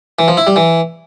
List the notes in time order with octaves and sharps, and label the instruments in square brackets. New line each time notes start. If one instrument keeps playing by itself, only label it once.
[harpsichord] E3
F3
E4
G3
E3